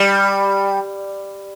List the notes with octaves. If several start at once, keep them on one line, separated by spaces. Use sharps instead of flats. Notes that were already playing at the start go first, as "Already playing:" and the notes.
Already playing: G3